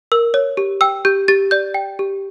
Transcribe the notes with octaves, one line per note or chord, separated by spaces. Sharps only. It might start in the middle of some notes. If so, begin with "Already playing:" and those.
A#4 E6
C#5
G4
G5 E6
G4 G6
G4 A6
D5 G6
G5
G4